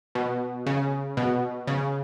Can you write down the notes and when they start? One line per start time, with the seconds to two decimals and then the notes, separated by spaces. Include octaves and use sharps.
0.15 B2
0.66 C#3
1.17 B2
1.67 C#3